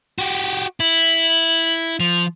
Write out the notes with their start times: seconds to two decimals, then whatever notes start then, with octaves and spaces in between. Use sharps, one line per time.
0.18 F#4 G4
0.80 E4 F#7
2.00 F3 F7